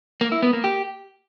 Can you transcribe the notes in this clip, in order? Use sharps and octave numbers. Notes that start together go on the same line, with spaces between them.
A#3
E4
B3
A#3
G4